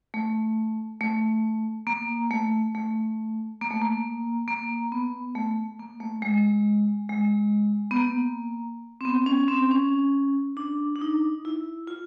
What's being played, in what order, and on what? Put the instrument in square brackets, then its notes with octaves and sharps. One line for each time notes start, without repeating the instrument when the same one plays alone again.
[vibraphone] A3
A3
A#3
A3
A3
A#3
A3
A#3
A#3
B3
A3
A#3
A3
G#3
G#3
B3
A#3
C4
B3
C#4
C4
C#4
D4
D4
D#4
E4
F4